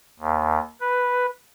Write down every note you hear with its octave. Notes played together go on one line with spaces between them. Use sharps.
D#2
B4